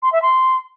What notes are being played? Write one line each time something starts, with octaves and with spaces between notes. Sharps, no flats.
C6
E5
C6